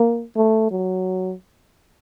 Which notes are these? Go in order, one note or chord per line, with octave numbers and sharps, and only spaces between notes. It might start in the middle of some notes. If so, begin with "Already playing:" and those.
Already playing: A#3
A3
F#3